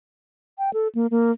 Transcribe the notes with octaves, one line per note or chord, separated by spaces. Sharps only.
G5
A4
A#3
A#3